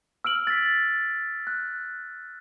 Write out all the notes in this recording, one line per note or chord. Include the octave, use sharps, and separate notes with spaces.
E6 F6 D7 F#7
A6 B6
F#6